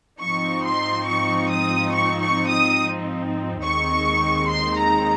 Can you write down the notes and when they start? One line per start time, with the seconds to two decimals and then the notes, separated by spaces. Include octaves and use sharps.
0.21 G#2 F3 C4 D#4 C#6
0.65 C6
1.07 C#6
1.51 D#6
1.93 C#6
2.21 C#6
2.50 D#6
3.64 D#2 D#3 G#3 C4 D#4 C#6
4.49 C6
4.78 A#5